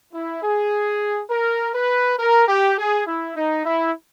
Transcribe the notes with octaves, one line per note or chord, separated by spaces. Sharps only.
E4
G#4
A#4
B4
A#4
G4
G#4
E4
D#4
E4